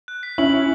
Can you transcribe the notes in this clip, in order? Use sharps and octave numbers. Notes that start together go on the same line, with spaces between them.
F#6
B6
C#4 E4 F#7
F#7